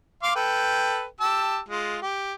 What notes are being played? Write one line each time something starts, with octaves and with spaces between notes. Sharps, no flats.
F5 C6 D6
A4 B4 G5
G4 A5 E6
G#3 F4
G4